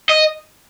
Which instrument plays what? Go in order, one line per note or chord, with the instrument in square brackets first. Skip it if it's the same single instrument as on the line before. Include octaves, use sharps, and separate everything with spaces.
[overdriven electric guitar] D#5